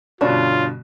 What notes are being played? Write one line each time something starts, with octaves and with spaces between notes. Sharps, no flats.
G1 B2 D3 C#4 D4 F4